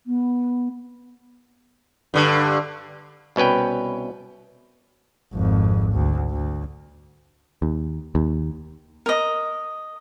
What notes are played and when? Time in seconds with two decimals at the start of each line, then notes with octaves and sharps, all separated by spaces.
0.06 B3
2.14 G2 D3
3.36 C2 B2 C#4 B4 G5
5.33 G#1 F2
5.94 D2
6.30 D2
7.62 D#2
8.15 D#2
9.06 A#4 D#5